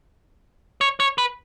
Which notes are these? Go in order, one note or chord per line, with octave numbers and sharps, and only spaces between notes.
C#5
C#5
B4